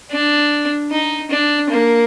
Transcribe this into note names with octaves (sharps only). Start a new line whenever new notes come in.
D4
D#4
D4
A#3